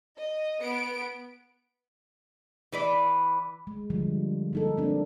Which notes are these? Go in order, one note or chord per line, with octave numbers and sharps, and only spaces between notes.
D#5
B3 D7
E3 B4 D5
G#3
D3 F3 G3
A#3 D#4 A4
A#3 C4 D4